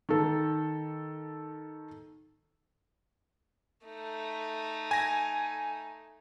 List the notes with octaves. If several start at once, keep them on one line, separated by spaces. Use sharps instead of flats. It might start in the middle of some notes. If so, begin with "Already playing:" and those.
D#3 A4
A3 D#4
G#5 A#6